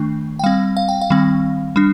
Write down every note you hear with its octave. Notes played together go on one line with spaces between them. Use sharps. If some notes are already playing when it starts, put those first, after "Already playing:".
Already playing: D#3 A3 D4
G5
G3 C4 F5
F5
G5
F5
D#3 G3 C4
G3 D4